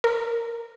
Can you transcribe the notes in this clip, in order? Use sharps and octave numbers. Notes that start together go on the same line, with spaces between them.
A#4